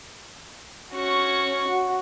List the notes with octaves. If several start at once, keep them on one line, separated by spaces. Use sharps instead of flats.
C#4 F#4 C#6
F#4